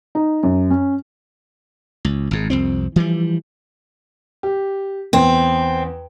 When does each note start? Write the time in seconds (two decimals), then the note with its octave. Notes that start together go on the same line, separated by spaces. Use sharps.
0.15 D#4
0.43 F#2
0.71 C#4
2.05 C#2
2.31 G#1 G#2
2.50 C2 F2 C4
2.96 E3 F3 G3
4.43 G4
5.13 E2 C4